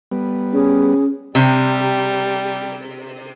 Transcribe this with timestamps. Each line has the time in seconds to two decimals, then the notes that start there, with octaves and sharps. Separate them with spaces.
0.12 G3 B3
0.54 C#4 G#4
1.35 C3 G3